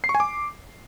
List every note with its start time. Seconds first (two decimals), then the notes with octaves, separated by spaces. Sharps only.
0.04 C7
0.09 C#6
0.15 G#5
0.20 D6